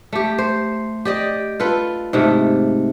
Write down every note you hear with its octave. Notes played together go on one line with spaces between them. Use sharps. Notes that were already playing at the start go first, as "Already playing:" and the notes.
A3 G4
C5
G4 D5 D#5
F4 A4 B4
G#2 C3 A3